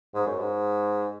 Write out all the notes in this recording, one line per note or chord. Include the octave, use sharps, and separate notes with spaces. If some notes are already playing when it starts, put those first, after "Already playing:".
G#2
F#2
G#2